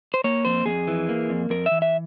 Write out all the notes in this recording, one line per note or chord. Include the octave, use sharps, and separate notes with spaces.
C5
A#3 C#5
F2 C5
F2 G#4
E3
A#3
F2
F2 A#4
E5
E3
E5